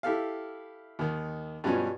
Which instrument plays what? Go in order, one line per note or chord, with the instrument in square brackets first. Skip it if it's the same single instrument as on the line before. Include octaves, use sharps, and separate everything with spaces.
[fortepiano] E4 G4 A4 F5
D#2 D#3
G2 B2 F3 F#3 C#4